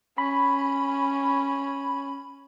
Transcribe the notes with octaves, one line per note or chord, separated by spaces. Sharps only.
C#4 B5